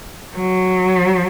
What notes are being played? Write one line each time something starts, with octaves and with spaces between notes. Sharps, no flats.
F#3